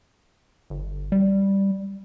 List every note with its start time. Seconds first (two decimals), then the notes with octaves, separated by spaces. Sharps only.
0.70 G1
1.12 G3